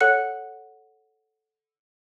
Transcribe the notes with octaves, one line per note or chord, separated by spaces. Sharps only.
A4 C#5 F#5 F#6 C#7